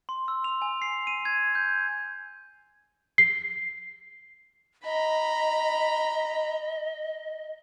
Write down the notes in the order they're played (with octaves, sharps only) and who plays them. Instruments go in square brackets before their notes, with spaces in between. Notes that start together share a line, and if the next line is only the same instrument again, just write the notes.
[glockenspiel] C6
E6
F7
G#5
C7
D#7
G#6
G6
[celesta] C7
[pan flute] D#5 [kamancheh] A#5 B5